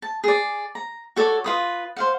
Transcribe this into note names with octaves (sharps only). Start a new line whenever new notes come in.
A5
G#4 D5
A#5
F#4 A4 C#5 D5
F4 B4 D#6
C5 F5 F#5